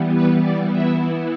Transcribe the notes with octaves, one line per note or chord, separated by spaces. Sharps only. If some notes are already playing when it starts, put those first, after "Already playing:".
Already playing: E3 G3 B3
B4
D5
E3 B3 E4 E5